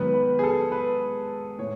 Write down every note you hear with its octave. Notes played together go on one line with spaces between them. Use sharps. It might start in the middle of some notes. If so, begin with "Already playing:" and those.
Already playing: G#2 D#3 F#3 B3 B4
B4
G#4
A4
B4
A2 C#5